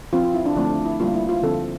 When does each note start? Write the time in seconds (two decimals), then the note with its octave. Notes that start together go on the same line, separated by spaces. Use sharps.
0.13 F3 C4 F4
0.24 F4
0.34 E4
0.46 D4
0.56 D3 F3 A3 C4 D4
0.71 D4
0.85 E4
1.00 D3 G3 A#3 F4
1.14 E4
1.29 F4
1.43 D3 F3 C4 A4